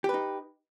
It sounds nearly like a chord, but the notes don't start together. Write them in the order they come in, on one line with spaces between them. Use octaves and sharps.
G4 B4 D#4